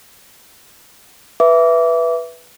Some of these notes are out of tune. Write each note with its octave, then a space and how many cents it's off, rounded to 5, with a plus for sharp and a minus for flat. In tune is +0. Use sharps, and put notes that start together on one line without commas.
B4 -5 E5 +10 D6 -25